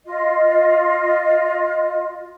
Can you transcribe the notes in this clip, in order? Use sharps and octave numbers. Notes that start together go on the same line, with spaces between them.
F4 D#5